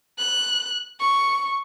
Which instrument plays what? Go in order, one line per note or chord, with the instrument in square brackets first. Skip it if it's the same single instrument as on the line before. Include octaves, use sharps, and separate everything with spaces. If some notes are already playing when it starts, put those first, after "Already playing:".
[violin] F#6
C#6